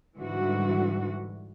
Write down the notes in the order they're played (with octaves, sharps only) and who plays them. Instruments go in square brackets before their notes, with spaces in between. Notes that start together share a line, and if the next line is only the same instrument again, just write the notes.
[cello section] G#2 D3 E3 G3 F#4